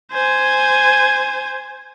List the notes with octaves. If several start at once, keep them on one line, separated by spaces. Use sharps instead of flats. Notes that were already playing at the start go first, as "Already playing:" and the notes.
C5 G#5